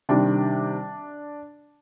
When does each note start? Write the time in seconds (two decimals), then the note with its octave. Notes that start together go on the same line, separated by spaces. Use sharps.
0.09 C3 D#3 G3 D4